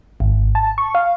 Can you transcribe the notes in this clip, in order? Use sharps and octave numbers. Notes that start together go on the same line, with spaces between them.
G#1
A5
C#6
F5